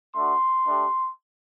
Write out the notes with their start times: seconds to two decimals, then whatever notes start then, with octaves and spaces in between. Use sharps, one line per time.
0.15 A3 D4 F#4 C6
0.67 A3 D4 G4